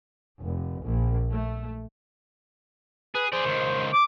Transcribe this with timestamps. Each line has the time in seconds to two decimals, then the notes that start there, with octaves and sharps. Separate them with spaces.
0.40 F1
0.84 A#1
1.31 A3
3.15 G#4 B4
3.33 G#4 C5 D5
3.46 C#2 D#3
3.93 D6